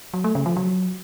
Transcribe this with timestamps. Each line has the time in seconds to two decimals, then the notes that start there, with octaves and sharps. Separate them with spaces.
0.14 F#3
0.24 A3
0.35 C#3
0.46 F3
0.57 F#3